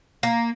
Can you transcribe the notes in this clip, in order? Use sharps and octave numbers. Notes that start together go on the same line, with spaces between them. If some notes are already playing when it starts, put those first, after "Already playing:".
A#3